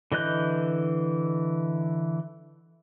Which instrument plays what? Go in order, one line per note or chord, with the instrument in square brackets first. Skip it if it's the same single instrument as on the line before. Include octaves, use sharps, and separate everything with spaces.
[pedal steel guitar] D3 E3 D#5 F#6 G6